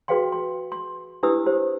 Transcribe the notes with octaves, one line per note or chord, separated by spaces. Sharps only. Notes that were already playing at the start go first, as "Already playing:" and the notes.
F#4 G#4 B4 F5 G5 C6
C6
C6
D4 E4 G4 B4 D#6 E6
G4 C5